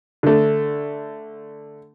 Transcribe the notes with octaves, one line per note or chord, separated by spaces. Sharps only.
D3 A3